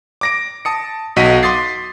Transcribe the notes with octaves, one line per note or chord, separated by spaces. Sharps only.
D6 A#6 D7
A5 D#6 C#7
B1 F#4 D#5 B6 D#7
C6 D6 D#6 A6 C7